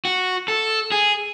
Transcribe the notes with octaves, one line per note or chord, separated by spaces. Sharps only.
F#4
A4
G#4